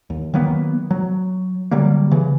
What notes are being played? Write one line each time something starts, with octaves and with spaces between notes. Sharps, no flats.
D#2
D#3 F#3 A#3 B3
F#3
D3 F#3 G3 A#3
C#3 E3